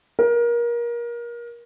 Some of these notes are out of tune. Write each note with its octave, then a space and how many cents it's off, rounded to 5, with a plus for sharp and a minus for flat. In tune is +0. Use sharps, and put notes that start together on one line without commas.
A#4 +25